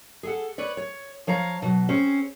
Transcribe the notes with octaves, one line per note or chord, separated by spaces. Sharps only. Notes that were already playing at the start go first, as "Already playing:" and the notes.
G#4 A4 F#5
B4 C#5 D5
C#5
F3 C#5 F5 A#5
B2 F#3
C4 C#4 G#4 C5